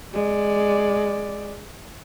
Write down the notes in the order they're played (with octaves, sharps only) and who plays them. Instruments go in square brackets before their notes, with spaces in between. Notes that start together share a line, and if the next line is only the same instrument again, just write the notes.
[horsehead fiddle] G#3 D5